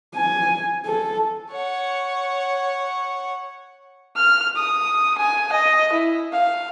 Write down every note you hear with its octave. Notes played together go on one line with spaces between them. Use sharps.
G#5
A4
C#5 F#5
F6
D#6
G#5
D#5
E4
F5